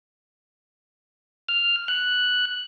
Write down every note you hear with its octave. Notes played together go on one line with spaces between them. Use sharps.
F6
F#6